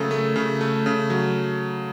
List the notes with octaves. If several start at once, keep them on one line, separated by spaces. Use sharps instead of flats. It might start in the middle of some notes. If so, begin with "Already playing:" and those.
Already playing: C#3 F#3 A3 A4 A#4
A3
C#3
A3
C#3
F#3